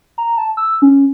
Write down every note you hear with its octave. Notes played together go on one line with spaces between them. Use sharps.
A#5
A5
E6
C#4